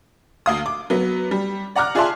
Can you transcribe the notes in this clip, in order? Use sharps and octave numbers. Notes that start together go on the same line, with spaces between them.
D2 F5 D#6
D6
F#3 B3
G3
D5 F#5 A#5 D6 F6 F#6
F4 G#4 D5 E5 A5 C6